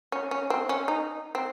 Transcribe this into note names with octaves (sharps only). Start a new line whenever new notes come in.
C#4
C#4
C4
C#4
D#4
C4